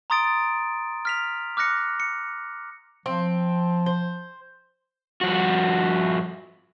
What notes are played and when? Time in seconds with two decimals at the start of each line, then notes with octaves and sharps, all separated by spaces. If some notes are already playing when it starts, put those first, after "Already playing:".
0.10 A#5 C6 D#6 A6 D7
1.05 F6 B6 F7
1.57 D6 F6 F#6 A#6 C#7
2.00 C#7
3.06 F3 C4
3.86 C5
5.21 G2 F3 F#4